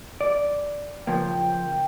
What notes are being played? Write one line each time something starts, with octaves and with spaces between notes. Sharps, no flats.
D5
C#3 F3 A#3 G5